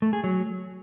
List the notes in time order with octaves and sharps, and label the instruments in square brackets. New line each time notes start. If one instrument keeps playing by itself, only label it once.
[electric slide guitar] A3
G#4
F#3